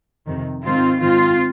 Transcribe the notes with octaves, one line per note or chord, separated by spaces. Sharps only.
F2 C3 D#3
G#2 D#3 C4 F4
G#2 D#3 C4 F4